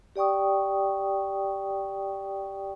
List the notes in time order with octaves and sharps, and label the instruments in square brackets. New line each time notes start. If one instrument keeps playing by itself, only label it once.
[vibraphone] G4 D5 G5 C#6 D#6